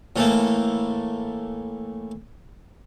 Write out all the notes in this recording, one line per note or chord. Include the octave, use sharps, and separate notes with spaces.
A2 E3 A3 A#3